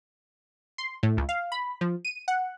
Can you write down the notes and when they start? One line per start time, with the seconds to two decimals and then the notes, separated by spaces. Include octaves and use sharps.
0.78 C6
1.03 A2
1.17 C#2
1.29 F5
1.52 B5
1.81 F3
2.05 D#7
2.28 F#5